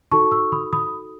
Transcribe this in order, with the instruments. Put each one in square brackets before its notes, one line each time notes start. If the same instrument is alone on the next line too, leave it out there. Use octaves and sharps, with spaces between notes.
[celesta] D#4 F#4 A4 A5 C#6
C#6 E6
B5 D#6
B5 D#6